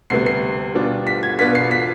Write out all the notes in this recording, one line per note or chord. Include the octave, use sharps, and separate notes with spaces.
D2 C3 G3 B3 C7
C7
B2 G3 D4 F4
B6
G#6
B2 B3 D4 F4 B6
C7
B6